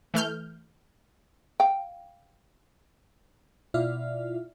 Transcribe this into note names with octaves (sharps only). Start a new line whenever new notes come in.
E3 A3 F6 G6
F5 G5
B2 E4 F4 D5 E5 F6